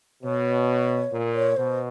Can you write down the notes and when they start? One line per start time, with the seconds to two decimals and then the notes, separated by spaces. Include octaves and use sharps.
0.23 B2 C#5
1.12 A#2
1.35 C#5
1.56 B2 C5